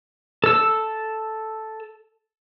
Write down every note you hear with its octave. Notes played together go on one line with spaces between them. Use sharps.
A4 E6